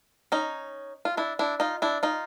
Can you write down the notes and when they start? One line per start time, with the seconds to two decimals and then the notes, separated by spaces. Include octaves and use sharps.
0.32 C#4 D#4
1.05 F4
1.17 D4 E4
1.39 D4 E4
1.60 D#4 F4
1.82 D4 E4
2.03 D#4 F4